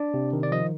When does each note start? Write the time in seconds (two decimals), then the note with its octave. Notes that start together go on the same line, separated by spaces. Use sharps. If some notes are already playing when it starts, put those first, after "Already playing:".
Already playing: D4 D5
0.14 C3
0.33 D#3
0.43 D5
0.52 F3 D#5